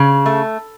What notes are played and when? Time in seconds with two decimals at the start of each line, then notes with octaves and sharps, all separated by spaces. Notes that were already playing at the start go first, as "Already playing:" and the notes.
Already playing: C#3
0.26 A3